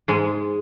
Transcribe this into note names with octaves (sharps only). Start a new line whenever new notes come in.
G#2 G#3